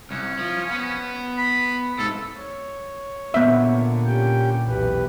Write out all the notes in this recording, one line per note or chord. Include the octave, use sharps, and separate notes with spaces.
C2 C#4
F3
B3
B5
G#2 C3 A4
C#5
A#2 D3 B3 C4 E5
C#4 G4 G5
B1 E2 G4 B4